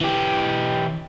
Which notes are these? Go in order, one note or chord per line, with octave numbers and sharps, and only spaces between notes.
E3 G4